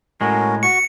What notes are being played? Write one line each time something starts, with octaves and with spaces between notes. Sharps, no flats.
A2 G#3 C#4 F#4 A#4
F#4 C#6 C#7